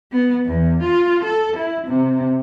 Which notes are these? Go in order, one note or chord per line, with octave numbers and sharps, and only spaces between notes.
B3
E2
F4
A4
E4
C3